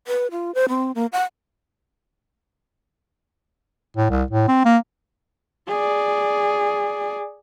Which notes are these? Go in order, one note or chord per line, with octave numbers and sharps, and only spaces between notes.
B4
F4
C5
C4
A#3
F#5
A2
C2
A2
C4
A#3
G#4 D5